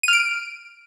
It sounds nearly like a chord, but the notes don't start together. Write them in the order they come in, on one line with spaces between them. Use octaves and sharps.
D#7 F6 D7